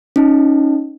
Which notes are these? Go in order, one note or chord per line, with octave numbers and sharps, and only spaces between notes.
C#4 D#4